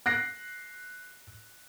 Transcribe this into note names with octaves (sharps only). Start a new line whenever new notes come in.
F#6 A#6 C7